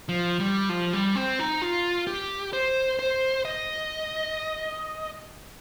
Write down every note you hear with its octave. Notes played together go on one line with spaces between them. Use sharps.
F3
G3
F3
G3
C4
D#4
F4
G4
C5
C5
D#5